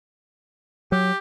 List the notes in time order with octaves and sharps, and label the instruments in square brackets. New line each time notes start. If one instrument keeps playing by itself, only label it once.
[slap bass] F#3 [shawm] G4